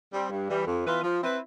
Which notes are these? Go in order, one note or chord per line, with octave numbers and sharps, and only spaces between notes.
G3 C4
G2
E3 G3
F2
E3 B3 F4 B4
F3
C4 E4 B4